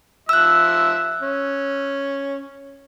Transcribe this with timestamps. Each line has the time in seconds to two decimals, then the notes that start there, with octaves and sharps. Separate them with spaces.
0.29 F3 E5 E6 F#6
1.21 C#4